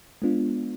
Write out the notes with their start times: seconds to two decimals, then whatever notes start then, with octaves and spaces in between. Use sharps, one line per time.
0.22 G#3 B3 D4 F4